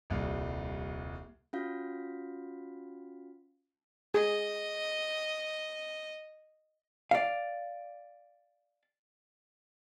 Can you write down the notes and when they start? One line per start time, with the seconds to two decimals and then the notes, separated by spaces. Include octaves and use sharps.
0.10 D#1 C2
1.53 C#4 F4 F#4 F5
4.14 G#4 D#5
7.11 D5 F5